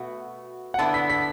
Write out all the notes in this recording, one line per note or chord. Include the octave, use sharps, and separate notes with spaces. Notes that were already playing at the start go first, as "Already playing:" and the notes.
Already playing: B2 A3 F#4
F#5
D3 B3 E4 A5
B6
B6